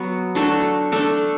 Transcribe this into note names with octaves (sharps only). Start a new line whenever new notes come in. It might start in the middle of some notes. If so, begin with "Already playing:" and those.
Already playing: F#3 B3 F#4
A3 D4 F#4 A4
A3 D4 A4